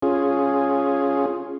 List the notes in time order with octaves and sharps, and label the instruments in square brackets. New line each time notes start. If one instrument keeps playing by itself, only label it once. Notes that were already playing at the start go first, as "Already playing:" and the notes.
[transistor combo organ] C#4 F4 G#4